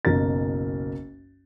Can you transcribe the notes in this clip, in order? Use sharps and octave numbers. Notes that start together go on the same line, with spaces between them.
F#1 B1 A#4 A6